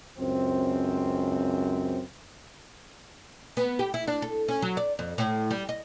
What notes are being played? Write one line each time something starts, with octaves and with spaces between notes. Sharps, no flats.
C#2 F#2 C4
B3
G4
E4
D4
A4
C#4
F#3
D5
F2
A2
G3
D#5